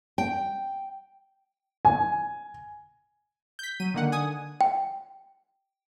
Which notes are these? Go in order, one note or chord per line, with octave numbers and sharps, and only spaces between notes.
G5
G#5
G6 B6
F#3 D#7
D3 D#3 A#3 F#5
G#5 D#6
G5